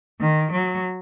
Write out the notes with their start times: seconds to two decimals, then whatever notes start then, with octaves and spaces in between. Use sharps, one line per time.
0.19 D#3
0.50 F#3